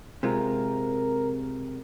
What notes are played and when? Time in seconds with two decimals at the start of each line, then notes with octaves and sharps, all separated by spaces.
0.23 C3 G#3 F4 A#4